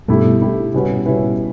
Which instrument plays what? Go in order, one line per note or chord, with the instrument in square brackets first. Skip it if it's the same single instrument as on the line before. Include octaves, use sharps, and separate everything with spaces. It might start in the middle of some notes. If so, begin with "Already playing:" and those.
[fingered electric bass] G2 B2 [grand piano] A3 E4 G4
[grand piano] A3 E4 G4
B2 G3 C#4 E4 B4
B2 G3 C#4 E4 B4